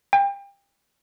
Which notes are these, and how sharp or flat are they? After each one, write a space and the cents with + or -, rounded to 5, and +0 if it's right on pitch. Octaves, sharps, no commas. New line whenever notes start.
G5 +30